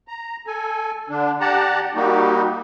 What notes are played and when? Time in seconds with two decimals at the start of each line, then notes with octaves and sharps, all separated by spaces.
0.08 A#5
0.47 A4 G#5
1.09 D3 D4
1.40 G4 D5 F#5 A5 A#5
1.95 G3 A#3 D#4 F#4 G4